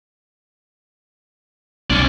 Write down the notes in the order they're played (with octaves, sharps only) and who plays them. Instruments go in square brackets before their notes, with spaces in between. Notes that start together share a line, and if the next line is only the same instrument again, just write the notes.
[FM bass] B1 [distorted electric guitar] C#4 D5